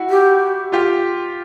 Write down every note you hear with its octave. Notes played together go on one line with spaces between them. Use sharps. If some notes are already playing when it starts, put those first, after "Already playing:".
Already playing: E4 F#4
G4
F4 G4